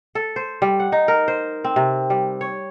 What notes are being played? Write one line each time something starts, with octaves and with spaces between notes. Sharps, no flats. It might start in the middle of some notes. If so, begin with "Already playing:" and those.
A4
C5
G3
F#5
D#4
A#4
C5
C4
C3
G3
C#5